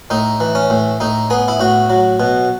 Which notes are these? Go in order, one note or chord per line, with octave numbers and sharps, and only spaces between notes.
A2 D#4
E3
C#4
A2
A2 D#4
B3 G#4
E4
A2 F#4
F#3
B2